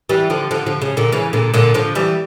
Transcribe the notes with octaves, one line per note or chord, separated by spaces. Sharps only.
E3 G3
D3 F3
D3 F3
D3 F3
C#3
A#2 D3
C#3 E3
A#2 D3
A#2 D3
D3 F3
E3 G3